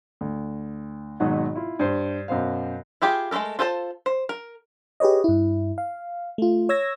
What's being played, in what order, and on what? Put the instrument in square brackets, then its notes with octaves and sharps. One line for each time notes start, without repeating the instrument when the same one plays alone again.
[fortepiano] D2
G#1 G#2 B2 F#3 D#4 F#5
E4 F4
G2 C5
F#2 B2 C5 F5
[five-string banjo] E4 F4 G4 G#4
G#3 A3 F4 A4 A#4
F4 A4 C5 C#5 A5
C5
A#4
[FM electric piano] G4 G#4 B4 C#5 D#5
G2 E4
F5
A3 F4
C#5 E6 G#6 A#6